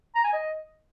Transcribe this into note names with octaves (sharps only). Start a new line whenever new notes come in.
A#5
G#5
D#5